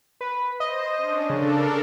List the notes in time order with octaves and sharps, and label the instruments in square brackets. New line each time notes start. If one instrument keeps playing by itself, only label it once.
[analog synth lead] B4
[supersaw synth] C5 [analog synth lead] D#5
[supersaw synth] C#4 D4
[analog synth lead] C#3 [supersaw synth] D4 A4 A#4